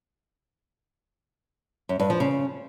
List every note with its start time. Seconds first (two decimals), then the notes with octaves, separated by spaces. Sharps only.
1.89 F#2
2.00 G2
2.10 F3
2.20 C#3